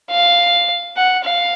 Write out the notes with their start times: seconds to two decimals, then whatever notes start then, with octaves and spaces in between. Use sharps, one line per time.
0.10 F5
0.96 F#5
1.24 F5